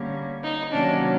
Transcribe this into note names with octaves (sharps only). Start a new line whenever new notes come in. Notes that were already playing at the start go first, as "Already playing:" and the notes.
Already playing: D3 G3 A#3 C#4
D#4
C3 D#3 F#3 A#3 C#4 D4